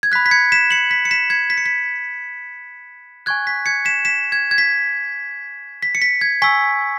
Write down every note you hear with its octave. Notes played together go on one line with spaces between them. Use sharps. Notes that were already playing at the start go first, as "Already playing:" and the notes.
G#6
B5 F#6 B6
B6
G#6 C#7
B6 E7
C#7 F#7
B6
C#7
B6 E7
G#6 C#7
B6
C#7
B6
G#5 C#6 F#6 G#6
B6
G#6 C#7
B6 E7
B6 E7
G#6
G#6
B6
B6
C#7
B6
G#6
G#5 C#6 E6 B6